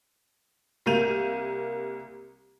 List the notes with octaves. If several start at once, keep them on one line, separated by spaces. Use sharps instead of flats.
C2 A#3 A#4 G6 D#7 F7